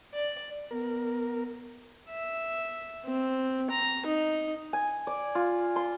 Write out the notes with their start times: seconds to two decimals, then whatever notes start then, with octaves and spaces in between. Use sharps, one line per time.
0.15 D5
0.71 B3 A#4
2.10 E5
3.05 C4
3.70 A#5
4.06 D#4
4.73 G#5
5.07 D5
5.35 F4
5.76 C6